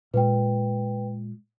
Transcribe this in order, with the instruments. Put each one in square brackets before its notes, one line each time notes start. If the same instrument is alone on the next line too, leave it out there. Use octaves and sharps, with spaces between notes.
[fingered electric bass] A#2 G#3 [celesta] B4 G5